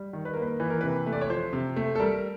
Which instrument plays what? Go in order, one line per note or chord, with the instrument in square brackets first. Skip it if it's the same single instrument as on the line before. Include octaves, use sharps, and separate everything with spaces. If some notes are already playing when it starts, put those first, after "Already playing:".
Already playing: [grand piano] G3
D#3
B4
A#4
A#3
B4
E3 B4
A#4
C3 B4
A3
D5
C#5
F3 C5
C3
A3
A4
G3 A#4